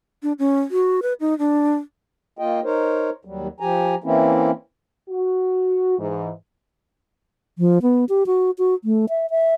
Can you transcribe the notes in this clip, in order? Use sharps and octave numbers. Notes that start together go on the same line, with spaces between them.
D4
C#4
F#4
B4
D#4
D4
A#3 F4 D#5 G5
D#4 A#4 C5 C#5
D#2 F#3 G3
F3 G4 G#5 A#5
E3 A#3 C4 C#4 E4
F#4
G#2 E3
F3
B3
G4
F#4
F#4
A3
E5
E5